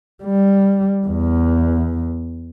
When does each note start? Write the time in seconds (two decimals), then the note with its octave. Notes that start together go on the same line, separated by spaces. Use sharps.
0.24 G3
1.07 E2